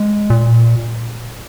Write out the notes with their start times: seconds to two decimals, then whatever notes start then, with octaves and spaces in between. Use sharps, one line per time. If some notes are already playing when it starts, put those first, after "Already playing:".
Already playing: G#3
0.30 A#2